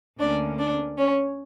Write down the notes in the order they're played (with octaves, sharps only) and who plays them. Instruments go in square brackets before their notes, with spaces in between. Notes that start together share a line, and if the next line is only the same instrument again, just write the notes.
[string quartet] D2 D3 A#3 C#4 D4 D5
D4 D5
C#4 C#5